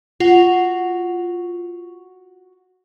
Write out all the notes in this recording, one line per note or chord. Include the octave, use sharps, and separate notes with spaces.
F4 F#4